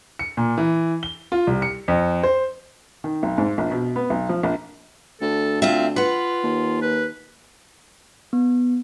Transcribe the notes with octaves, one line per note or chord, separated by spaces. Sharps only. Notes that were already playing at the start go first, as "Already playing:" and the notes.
C#7
A#2
E3
G7
F4
C2
C#7
F2
C5
D#3
B1
G#2
A#1
B2
B3
B1
F3
A#1
D2 A4
C4 F4 E5
F4 B4 F#5
D#2
B4
B3